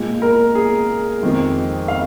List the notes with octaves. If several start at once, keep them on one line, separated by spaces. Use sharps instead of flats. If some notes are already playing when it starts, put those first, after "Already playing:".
Already playing: A#2 G#3
A#4
G#4
F2 D#3 G#3
F5